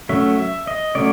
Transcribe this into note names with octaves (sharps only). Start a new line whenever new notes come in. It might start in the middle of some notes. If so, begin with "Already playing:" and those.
F#3 A3 C#4 E5
E5
D#5
F#3 A3 C#4 D5